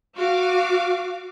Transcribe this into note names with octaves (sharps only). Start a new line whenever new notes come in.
F#4 F5 D6